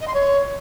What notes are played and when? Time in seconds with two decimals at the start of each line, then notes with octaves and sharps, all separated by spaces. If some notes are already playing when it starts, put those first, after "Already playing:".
0.01 D#5
0.07 C6
0.14 C#5